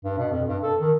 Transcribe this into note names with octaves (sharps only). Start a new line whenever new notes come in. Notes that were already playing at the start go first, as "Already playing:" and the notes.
G2
B2
F2
G2
A4
D#3